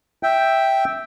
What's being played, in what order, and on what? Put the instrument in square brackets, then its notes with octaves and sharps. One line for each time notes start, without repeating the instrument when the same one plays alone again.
[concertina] E5 G5